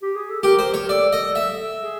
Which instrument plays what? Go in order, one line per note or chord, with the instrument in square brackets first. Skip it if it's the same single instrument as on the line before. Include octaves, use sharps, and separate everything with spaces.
[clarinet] G4
G#4
A4
[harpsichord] G4 [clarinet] A#4
[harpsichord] C5
C#5
[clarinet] A#4
[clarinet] A4 [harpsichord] D5
[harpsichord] D#5
E5
[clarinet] G#4